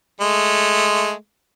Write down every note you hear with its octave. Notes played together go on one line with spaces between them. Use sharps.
G#3 A3